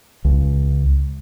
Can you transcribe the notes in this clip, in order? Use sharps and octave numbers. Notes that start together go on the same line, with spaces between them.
C#2